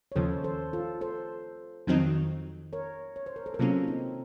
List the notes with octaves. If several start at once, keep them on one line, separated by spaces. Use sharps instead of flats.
C#5
D#2 C#3 F3 A4 C5
A4 C5
F4 A4
A4 C5
F2 D#3 F#3 C4 D#4
A#4 C#5
C#5
C5
A#4
A4 C5
A#4
C3 F#3 A#3 C#4 F4 A4
C4 D#4